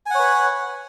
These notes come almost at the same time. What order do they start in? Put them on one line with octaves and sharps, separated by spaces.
G#5 F#5 C#5 B4